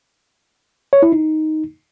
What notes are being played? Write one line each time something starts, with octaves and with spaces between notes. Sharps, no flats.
C#5
E4
D#4